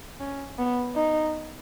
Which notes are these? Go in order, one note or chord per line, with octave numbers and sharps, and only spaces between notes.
C#4
B3
D#4